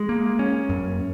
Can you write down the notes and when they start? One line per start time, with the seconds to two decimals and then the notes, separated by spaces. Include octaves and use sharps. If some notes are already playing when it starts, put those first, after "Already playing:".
Already playing: G#3
0.09 A#3
0.39 C#4
0.69 F#2